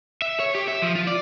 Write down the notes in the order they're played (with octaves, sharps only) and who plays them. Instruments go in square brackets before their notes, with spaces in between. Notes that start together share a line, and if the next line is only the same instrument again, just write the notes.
[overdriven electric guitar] E5
C#5
G4
E5
F3
F4
D5